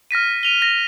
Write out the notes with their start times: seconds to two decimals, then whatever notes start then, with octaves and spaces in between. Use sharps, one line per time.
0.11 F6 A#6 B6 D#7
0.43 D#7 F7 G7
0.62 A#6